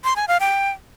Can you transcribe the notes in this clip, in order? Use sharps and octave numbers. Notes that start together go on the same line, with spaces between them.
C6
G#5
F5
G5